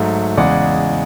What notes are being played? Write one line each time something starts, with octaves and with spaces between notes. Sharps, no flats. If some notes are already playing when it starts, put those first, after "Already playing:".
Already playing: G#2 F#3 A3
E2 C#3 G#3 D5 F#5